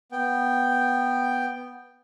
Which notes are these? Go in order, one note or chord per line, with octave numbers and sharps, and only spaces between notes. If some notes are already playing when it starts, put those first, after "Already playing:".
B3 G5